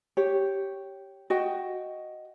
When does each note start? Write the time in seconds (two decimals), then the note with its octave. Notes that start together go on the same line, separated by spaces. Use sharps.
0.17 G4 C#5
1.30 F#4 D#5 G5